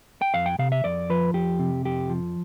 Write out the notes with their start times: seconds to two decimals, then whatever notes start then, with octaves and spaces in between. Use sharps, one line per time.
0.22 G5
0.34 F2 F5
0.46 G5
0.59 C3 F5
0.72 E5
0.84 F2 D5
1.10 F3 B4
1.34 F2 G4
1.59 C3
1.85 F2 G4
2.09 F3